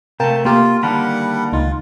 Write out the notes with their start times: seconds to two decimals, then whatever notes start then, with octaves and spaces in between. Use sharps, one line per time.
0.20 C3 A3 A#4 F5 G5 A5
0.45 A#3 F4 G4 A#4
0.83 D3 D#3 G3 A#3 F#5 A5 B5
1.53 C#2 D#4 F4